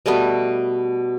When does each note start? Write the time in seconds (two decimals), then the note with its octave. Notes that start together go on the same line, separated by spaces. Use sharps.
0.06 B2 G3 A3 B3